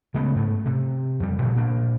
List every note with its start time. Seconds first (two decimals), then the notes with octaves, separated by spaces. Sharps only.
0.14 C#3 G#3 A3 B3
0.35 G#2 A3
0.66 C3
1.20 F2 G3
1.42 A1 A#2 D3
1.55 A#2 A#3 D4